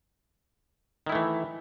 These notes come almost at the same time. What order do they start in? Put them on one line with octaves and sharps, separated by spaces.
D#3 E4 A3 E3